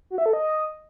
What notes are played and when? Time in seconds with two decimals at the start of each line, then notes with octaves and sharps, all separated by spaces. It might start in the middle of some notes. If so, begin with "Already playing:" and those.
0.10 F#4
0.18 E5
0.26 A4
0.33 D#5